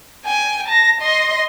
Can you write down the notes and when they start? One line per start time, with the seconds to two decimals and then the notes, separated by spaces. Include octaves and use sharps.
0.25 G5 G#5
0.68 A5 A#6
1.01 D#5 C6